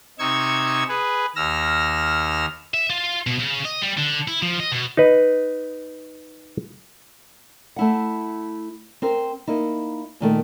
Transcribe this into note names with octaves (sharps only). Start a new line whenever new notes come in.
C3 D#4 C#6 E6 G#6
G#4 B4
D#2 E6 F6 A#6
E5
F4
B2
C#3
D#5
G3
D3
E4
F3
D#5
B2
D#4 B4
A3 E4 F#5
C4 A#4 C5
A#3 D#4 E4
A#2 D#3 A3 A#3